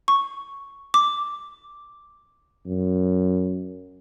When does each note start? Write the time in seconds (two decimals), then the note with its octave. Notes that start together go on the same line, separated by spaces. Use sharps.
0.08 C#6
0.94 D6
2.67 F#2